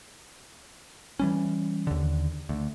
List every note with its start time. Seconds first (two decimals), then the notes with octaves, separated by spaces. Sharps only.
1.19 E3 G3 C#4
1.87 D#2 D3
2.49 D2